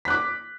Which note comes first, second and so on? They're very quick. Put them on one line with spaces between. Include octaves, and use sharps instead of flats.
B6 F#6 D6